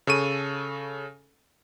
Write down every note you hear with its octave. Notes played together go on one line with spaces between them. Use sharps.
C#3 A4 C#6 D#7